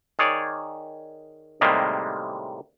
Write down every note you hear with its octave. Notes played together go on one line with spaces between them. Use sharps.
D#3 G#4 C#5 D5
A2 C3 D#3 G3 G#3 A#3